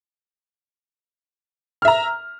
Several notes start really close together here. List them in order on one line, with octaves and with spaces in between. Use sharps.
F6 E5 A#5